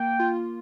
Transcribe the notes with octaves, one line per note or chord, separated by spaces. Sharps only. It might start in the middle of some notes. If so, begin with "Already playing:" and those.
Already playing: A#3 G5
F4